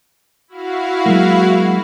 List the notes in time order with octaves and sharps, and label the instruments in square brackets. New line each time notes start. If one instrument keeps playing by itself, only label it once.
[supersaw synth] E4 F#4 F5
[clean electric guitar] F#3 G#3 A#3